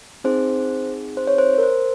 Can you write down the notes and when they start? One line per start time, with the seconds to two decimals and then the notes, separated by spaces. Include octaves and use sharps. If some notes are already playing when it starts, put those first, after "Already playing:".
0.24 C4 D#4 G#4 C5
1.17 C5
1.27 C#5
1.38 C5
1.58 A#4
1.63 C5